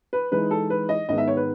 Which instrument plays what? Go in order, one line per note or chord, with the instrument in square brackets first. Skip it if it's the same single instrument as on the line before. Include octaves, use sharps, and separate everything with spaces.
[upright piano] B4
[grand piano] E3 G#3 D#4 G#4 [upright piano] B4
[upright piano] A4
B4
D#5
[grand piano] G#2 D#3 G#3 B3 [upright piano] D#5
[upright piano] E5
C#5
B4